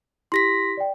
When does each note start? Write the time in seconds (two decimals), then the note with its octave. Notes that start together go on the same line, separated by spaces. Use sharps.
0.32 E4 G4 C6 A#6 B6
0.77 D5 G5